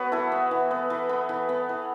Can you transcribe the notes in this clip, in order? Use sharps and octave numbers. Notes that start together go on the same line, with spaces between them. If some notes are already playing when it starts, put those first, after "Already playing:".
Already playing: B3 F#4 B4 C#5
E3 E4 A4
B3
E3
B3
E3
B3
E3
B3
E3